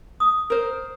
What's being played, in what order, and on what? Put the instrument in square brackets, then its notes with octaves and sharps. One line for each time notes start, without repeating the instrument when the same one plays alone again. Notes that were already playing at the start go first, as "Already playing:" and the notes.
[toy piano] D#6
[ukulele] A#4 C5